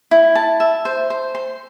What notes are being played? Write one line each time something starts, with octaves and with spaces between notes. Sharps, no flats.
E4
A5
E5
C5
C5
C6